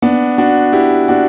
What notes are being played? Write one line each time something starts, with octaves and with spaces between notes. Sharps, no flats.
B3 D4
D4 F#4
E4 G4
D4 F#4